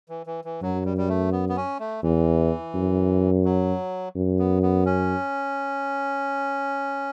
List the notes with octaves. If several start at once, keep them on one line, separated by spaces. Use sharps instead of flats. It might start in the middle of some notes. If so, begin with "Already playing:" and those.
E3
E3
E3
F#2 F#3
G3
G3
A3
B3
B3
C#4
A3
E2 E3
F#2
F#3
F#2
B3
B3
C#4